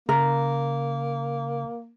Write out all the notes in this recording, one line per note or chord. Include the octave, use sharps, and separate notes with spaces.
C#3 A#3 A#4